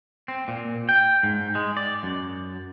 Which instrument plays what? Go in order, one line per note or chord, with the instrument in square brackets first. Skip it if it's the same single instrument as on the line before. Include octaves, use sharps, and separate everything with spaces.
[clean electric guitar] C4
A#2
G5
G#2
G#3
D5
F#2